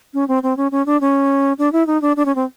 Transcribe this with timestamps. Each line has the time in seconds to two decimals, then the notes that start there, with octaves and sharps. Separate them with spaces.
0.14 C#4
0.28 C4
0.43 C4
0.57 C#4
0.72 C#4
0.86 D4
1.01 C#4
1.59 D4
1.72 E4
1.87 D#4
2.02 D4
2.17 D4
2.26 C#4
2.35 C4